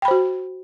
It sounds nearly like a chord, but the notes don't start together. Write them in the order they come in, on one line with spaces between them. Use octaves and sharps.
G5 B5 C5 F#4